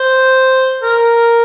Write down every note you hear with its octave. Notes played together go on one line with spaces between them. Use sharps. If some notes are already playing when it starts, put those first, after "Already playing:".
Already playing: C5
A#4